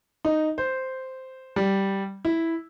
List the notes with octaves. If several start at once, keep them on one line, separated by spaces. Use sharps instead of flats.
D#4
C5
G3
E4